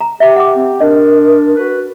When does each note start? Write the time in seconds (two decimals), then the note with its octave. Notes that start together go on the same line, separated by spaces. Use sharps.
0.01 A#5
0.20 G4 E5 B5
0.36 F#5 D6
0.55 C4
0.80 D4 A#4 D#5
1.57 F#4 B4